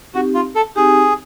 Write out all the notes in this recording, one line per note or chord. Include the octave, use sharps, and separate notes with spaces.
C4 D#4 F#4 G4
F4
A4
C4 D#4 G4 G#4